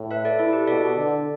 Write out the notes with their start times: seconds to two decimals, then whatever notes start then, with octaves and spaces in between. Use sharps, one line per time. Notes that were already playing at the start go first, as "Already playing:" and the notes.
Already playing: A2
0.11 B4 E5
0.25 A4 D5
0.39 E4 A4
0.53 G4 B4
0.67 B2 A4 D5
0.96 D3